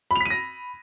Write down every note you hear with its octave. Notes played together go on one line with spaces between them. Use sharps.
B5 A#6 B6 D#7 F7